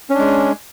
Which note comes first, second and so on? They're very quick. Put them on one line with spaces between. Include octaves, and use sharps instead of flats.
C#4 D4 G#3